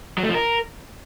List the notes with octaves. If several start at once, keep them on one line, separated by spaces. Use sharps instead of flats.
F#3
A3
F3
A#4